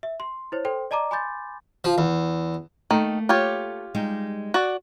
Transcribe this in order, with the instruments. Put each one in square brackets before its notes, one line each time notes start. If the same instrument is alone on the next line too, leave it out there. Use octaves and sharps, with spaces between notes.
[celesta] E5
C6
E4 C5 C#5
A4 C5 G5 C6
D5 D#5 A5 A#5 D6
G#5 B5 C6 D6 G6 A6
[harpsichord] F3
E2
[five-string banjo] D#3 [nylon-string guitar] A3 A#3
[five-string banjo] F4 G4 C#5
[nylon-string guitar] G3 G#3 D#4
[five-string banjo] F#4 D5